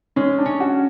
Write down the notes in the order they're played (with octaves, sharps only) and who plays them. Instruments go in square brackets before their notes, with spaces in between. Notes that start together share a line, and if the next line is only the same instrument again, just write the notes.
[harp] G#3 [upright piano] C#4
[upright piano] D4
[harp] C#4
[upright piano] F#4